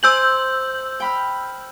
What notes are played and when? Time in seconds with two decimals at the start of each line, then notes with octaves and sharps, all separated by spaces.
0.03 C5 G#5 E6 G6 F#7
1.00 G5 B5 F6